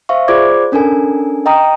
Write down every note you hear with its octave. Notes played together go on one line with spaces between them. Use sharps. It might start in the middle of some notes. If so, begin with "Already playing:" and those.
C5 E5 F5 C#6
F4 G#4 C5 D5 D6 G#6
C#4 D4 A4 A#4 G#5
D#5 G5 A#5 D#6